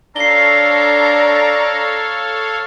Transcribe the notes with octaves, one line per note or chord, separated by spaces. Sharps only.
D4 A4 C#5 F5 A#5 C7 G7